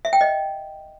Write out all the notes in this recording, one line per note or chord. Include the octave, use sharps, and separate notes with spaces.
E5
G5
D#5